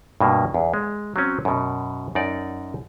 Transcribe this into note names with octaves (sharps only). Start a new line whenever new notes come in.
G2 B2 A#3
E2
G#3
F#3 C4 C#4
F#2 B2
F#2 D#4 D5